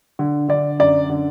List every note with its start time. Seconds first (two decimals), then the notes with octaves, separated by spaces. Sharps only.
0.19 D3
0.48 D3 D5
0.79 F#2 D5
1.10 D3